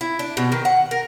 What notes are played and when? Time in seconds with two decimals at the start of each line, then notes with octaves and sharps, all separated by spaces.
0.01 E4
0.19 D4
0.37 B2
0.52 D#3
0.65 F#5
0.91 A#4